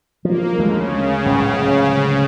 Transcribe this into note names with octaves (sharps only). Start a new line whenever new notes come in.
F3 A#3
D2 C#3 G#3
D1 C#2